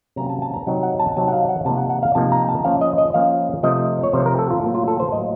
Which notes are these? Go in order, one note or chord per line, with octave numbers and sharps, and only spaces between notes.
C3 F#3 A#3 C#4 A#5
A5
A5
A#5
C3 F#3 C4 D#4 F#5
F#5
A5
C3 F#3 C4 D#4 A5
F#5
F5
F#5
C3 F3 A#3 D#4 A5
F#5
F#5
F5
C3 F3 A#3 D#4 A5
A#5
A5
F3 A#3 C#4 F5
D#5
D#5
F3 A#3 C#4 F5
C3 F3 A3 D#5
C#5
C3 F3 A3 C5
A#4
A4
F4
A2 F#3 A#3
F4
A4
C5
A2 F#3 A#3 D#5